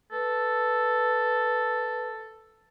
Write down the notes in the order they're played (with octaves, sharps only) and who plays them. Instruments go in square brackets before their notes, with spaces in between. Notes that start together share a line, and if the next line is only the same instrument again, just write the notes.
[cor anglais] A4 [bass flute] B4